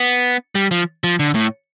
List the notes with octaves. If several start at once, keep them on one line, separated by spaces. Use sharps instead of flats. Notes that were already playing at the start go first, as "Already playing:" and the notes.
Already playing: B3
G3
F3
F3
D3
A2